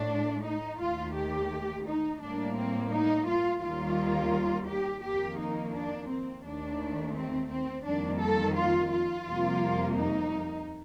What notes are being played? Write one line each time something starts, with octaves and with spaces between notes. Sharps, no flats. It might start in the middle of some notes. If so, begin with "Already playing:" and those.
Already playing: A2 A3 D4
D#4
D#2 D#3 A3 F4
G4
D#4
A2 G3 A#3 D4
C4
D#4
F4
D#2 D#3 G3 A#3 F4
G4
F2 D#3 A#3 G4
D#4
D4
C4
D#2 D#3 A3 D4
C4
C4
F2 D#3 G3 A#3 D4
A4
F4
F4
F2 C3 G3 A#3
D#4